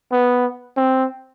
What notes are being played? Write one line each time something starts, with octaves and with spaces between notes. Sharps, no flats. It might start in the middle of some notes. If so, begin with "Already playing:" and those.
B3
C4